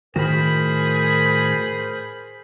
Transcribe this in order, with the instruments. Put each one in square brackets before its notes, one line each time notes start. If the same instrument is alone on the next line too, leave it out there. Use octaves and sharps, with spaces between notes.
[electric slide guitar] A2 D#3 F#4 [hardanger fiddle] G#4 B5 [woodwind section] A#4 C5